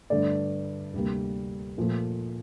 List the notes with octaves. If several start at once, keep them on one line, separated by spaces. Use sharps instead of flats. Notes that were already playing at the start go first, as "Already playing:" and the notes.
G2 D3 A3 D5
D2 C3 G3 A#3
A#2 F3 A3